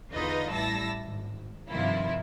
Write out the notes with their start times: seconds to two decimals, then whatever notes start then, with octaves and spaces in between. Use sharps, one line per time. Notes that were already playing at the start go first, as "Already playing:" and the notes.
0.13 E2 D3 D#4 F4 B4 D#5
0.51 A1 G3 E4 A5 E6 A#6
1.04 G#1
1.70 G2 C3 D#3 F3 E4 F4